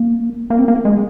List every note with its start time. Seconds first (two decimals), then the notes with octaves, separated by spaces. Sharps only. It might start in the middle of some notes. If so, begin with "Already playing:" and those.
Already playing: A#3
0.50 A#3
0.59 C4
0.68 A#3
0.85 G#3